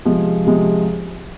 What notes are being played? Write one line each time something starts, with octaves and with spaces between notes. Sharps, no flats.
C3 F3 G#3
C3 F3 G#3